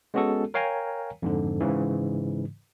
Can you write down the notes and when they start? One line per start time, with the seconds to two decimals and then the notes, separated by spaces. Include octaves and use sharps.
0.14 G#3 B3 C#4 F#4 G#4 A4
0.54 A#4 C#5 F5 G5 G#5 A#5
1.22 F2 G#2 D3
1.60 G#2 C#3 E3